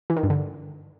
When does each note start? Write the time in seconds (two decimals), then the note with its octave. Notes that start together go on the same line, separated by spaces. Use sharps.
0.10 E3
0.17 D#3
0.23 G2
0.30 D3